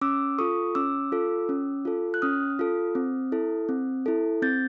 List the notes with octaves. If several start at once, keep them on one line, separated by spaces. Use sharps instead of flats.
C#4 D6 E6
F4 A4 C#6 D#6
C#4 D6 E6
F4 A4
C#4
F4 A4
F#6
C#4 D#6 F6
F4 A4
C4
E4 A4
C4
E4 A4
C4 G6 A6